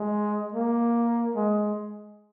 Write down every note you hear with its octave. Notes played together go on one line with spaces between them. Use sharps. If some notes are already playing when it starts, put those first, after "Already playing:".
Already playing: G#3
A#3
G#3